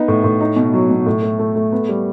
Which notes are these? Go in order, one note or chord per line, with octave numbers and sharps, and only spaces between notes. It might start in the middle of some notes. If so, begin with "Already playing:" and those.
Already playing: B3 D#4
A2
A2
D#4
B2
F#3
B2
A2
A3
A3
A3
B3
G3